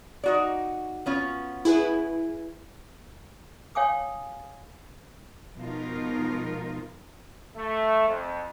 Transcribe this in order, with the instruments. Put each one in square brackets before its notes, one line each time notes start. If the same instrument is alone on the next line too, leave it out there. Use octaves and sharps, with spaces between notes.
[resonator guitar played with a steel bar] D#4 F#4 D5
B3 C#4 F4
[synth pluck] E4 G#4 B4
[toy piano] C#5 F5 G5 G#5 D6 D#6
[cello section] B2 F3 G#3 D#4 F4 A#4
[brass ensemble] A3
F2